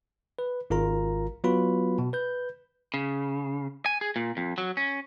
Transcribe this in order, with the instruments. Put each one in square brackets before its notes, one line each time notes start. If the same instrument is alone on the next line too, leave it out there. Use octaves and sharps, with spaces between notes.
[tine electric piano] B4
G#1 F4 A#4 A#5
F#3 B3 F4 F#4 B4 B5
B2
B4 G6
[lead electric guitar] C#3
G#5
G#4
A#2
F2
F#3
C#4